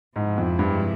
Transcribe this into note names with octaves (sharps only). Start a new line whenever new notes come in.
G#2 C3 F3 G#3 E4
F2
G2